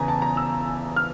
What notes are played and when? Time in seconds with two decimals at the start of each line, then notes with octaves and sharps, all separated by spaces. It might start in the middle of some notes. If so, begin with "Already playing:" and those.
Already playing: E2 C#3 E3 G#5 A#5
0.08 A5
0.22 A#5
0.37 E6
0.96 F6